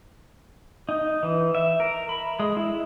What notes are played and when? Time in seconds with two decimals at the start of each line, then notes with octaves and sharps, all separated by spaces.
0.89 D#4
1.23 E3
1.55 E5
1.80 A#4
2.09 B5
2.40 G#3
2.57 E4